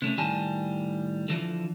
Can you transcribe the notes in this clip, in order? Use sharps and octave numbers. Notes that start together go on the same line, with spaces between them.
C3 A3 C#4
A2 D#3 G3 G#5 A5
D3 E3 F3